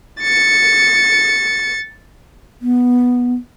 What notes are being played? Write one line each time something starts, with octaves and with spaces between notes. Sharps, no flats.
A6 C#7
B3